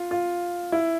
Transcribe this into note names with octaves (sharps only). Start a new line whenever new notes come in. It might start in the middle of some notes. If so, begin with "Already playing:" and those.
Already playing: F4
F4
E4